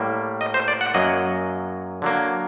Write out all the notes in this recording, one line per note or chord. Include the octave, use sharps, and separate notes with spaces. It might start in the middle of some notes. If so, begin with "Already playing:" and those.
Already playing: A2 G3 A#3
D#5
C5
D5
F#5
F#2 F#3 A#3 D#5
D3 F#3 A#3